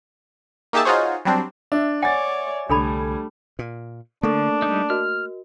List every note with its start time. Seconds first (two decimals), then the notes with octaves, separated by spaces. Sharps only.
0.73 A#3 D#4 G4 G#4 E5 A5
0.85 D#4 F4 F#4 G#4 C5 C#5
1.25 F#3 G3 C4 D4
1.72 D4 E5
2.02 C#5 D5 F#5 G#5 A6
2.69 C2 D3 G3 A3 D4 A4 B5 G#6
3.59 A#2
4.23 D3 A3 A#3 D4 A4 C#6
4.62 G3 D#4
4.90 F#4 A#4 D#5 F6